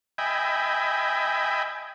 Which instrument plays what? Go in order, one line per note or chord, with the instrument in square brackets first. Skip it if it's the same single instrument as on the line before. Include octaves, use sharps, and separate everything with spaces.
[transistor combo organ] D#5 E5 G5 G#5 B5